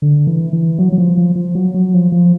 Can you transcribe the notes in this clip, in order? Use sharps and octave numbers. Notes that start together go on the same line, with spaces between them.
D3
E3
E3
F#3
F#3
F3
F3
F3
F#3
F#3
F3
F3